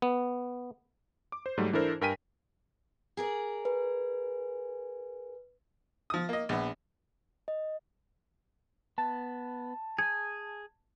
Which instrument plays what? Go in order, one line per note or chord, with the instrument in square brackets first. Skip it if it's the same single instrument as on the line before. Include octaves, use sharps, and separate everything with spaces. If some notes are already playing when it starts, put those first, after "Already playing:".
[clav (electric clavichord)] B3
[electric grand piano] D6
C5
G#2 F#3 G3 A3
E3 D4 E4 A4 A#4 C5
G2 A#4 G5 G#5 B6 D#7
[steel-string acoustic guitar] G#4 A#4 D5
[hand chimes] B4
[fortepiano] F3 D#6
A#3 D#5
A#1 B3
[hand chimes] D#5
[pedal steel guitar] B3 [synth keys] A5
[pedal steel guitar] G#4 G#5 [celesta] G#6